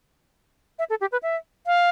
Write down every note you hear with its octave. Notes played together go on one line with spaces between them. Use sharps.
E5
A4
G4
B4
E5
F5